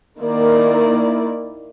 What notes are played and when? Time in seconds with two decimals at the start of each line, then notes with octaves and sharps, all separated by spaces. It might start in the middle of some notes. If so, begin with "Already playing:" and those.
0.21 D#3 A#3 E4 D5